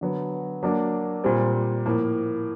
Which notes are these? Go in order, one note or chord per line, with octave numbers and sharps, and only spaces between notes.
D3 F#3 B3
F#3 A#3 D4
A#2 G3 C4
A2 F3 A#3